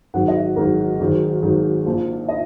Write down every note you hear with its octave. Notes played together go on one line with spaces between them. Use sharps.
G#1 G#2 F#3 F#5
D#5
G#1 G#2 F#3 A#4
G#1 G#2 D#3 F#3
G#1 G#2 D#3 F#3
A#1 A#2 F3
D#5